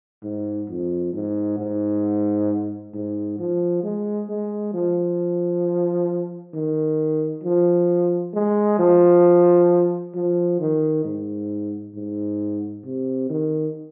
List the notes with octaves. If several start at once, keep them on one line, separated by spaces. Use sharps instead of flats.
G#2
F2
G#2
G#2
G#2
F3
G#3
G#3
F3
D#3
F3
G#3
F3
F3
D#3
G#2
G#2
C3
D#3